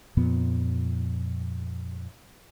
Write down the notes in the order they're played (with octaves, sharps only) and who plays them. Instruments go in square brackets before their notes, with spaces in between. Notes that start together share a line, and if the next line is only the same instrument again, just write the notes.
[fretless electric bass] F2 A#2 F3 B3